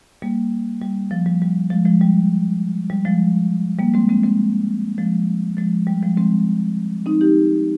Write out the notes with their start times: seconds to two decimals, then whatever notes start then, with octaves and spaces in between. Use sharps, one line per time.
0.22 G3 A#3
0.81 G3
1.11 F3
1.26 G3
1.42 G3
1.70 F3 G#3
1.85 F3 G#3
2.01 G3
2.90 G3
3.05 F3 G#3
3.79 G3 A#3
3.94 G#3 C4
4.09 G#3 C4
4.23 G#3 C4
4.98 F3 G#3
5.57 F3 G#3
5.87 G3
6.02 F3 G#3
6.17 G#3 C4
7.06 C4 D#4
7.21 D#4 G4